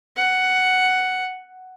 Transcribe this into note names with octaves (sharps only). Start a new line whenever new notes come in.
F#5